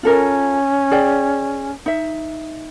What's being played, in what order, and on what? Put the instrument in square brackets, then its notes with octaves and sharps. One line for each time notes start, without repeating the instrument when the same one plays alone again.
[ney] C#4 [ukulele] F4 A4 A#4
[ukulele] G#4 D5 G5
D#4 E5